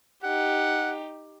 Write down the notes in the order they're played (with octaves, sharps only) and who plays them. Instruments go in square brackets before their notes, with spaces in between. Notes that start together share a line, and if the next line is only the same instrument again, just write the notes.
[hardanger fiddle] D#4 G4 [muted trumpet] F#5